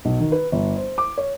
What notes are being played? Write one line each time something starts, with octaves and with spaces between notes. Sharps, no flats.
B1
D#3
B4
G1
C5
D6
C#5